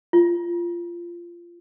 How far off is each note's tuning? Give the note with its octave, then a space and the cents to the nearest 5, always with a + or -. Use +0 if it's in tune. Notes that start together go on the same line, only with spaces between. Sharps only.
F4 -15